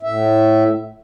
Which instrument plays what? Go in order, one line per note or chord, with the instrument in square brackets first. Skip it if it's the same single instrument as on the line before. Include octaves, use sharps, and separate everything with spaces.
[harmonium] A2 E5